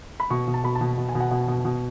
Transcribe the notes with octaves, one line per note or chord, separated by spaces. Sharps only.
B5
B2 C#6
B2
A5
B2 B5
A5
B2
B2
G#5
B2
F#5
B2
B2
B2